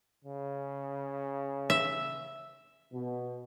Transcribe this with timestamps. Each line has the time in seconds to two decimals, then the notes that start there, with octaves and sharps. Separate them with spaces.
0.25 C#3
1.70 E5
2.92 B2